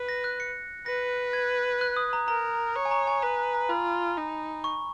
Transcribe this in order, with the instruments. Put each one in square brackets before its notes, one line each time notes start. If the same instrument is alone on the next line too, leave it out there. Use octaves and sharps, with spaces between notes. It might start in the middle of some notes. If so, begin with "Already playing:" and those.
Already playing: [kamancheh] B4
[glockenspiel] A#6
F#6
C#7
[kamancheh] B4 [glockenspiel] A#6
[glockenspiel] G#6
F#6
D#6
A#5
[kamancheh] A#4 [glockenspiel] A#5
[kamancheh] C#5
[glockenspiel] G#5
A#5
G#5
[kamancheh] B4 [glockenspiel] A#5
[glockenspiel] A#5
A#5
[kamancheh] F4 [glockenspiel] B5
[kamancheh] D#4
[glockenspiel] C#6